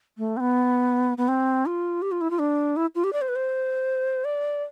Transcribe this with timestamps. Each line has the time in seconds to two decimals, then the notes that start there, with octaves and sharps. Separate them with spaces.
0.18 A3
0.37 C4
0.40 B3
1.18 B3
1.28 C4
1.66 F4
2.02 G4
2.12 F4
2.21 E4
2.30 F4
2.40 D4
2.76 E4
2.95 F4
3.04 G4
3.13 D5
3.21 C5
3.29 B4
3.36 C5
4.25 D5